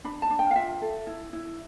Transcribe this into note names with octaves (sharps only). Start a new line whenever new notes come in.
D4 B5
A5
D4
G5
F5
F4 E5
A4
E4
E4